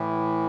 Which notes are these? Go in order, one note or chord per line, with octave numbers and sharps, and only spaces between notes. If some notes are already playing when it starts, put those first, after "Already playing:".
Already playing: A2 E3